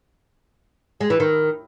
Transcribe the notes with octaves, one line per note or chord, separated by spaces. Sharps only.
G#3
E3
D#3